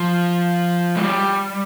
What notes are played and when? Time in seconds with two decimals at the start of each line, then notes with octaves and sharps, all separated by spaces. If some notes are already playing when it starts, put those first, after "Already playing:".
Already playing: F3
0.97 G#3
1.03 G3